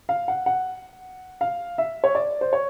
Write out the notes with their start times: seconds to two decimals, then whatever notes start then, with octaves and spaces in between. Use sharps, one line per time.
0.09 F5
0.28 F#5
0.46 F#5
1.41 F5
1.78 E5
2.04 C#5
2.15 D5
2.41 C5
2.53 C#5